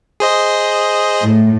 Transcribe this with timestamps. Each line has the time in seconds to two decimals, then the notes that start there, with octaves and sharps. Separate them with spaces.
0.20 G#4 C5 D#5
1.22 A2